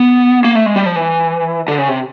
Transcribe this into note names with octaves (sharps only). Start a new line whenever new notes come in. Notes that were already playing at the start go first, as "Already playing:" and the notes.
Already playing: B3
A#3
A3
G#3
G3
F3
E3
D3
C#3
C3